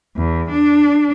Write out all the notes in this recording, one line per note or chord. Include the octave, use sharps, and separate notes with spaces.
E2
D4